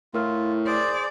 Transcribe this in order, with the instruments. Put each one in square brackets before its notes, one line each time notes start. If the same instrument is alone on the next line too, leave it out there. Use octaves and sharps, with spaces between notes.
[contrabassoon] A2 [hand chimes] E4 A#4 F6 [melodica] F4
[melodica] G#4 C5 [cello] D5